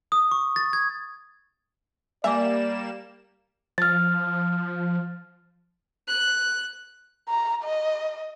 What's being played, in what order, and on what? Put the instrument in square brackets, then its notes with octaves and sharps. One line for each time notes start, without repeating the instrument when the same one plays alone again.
[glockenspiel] D#6
C#6
A6
G#6
[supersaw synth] G3 A#3 E7 [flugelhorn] D5 [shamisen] E5 [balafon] G#5 D6
[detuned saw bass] F3 [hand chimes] F6 A6
[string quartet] F#6
[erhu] A#5
D#5